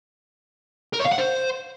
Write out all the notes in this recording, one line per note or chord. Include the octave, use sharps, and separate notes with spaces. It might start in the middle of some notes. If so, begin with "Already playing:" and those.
A#4
C#5
F5
F#5
C5